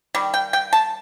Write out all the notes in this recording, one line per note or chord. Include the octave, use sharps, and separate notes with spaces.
D#3 G3
G5
G5
A5